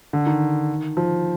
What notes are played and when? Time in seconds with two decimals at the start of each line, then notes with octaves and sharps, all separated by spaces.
0.13 D3
0.26 D#3
0.97 F3